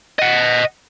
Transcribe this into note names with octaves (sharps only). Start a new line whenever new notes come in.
D#5 F#5